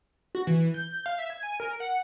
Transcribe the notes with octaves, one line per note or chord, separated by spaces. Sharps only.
F#4
E3
G6
F5
E5
G#6
G#5
A#4
F#5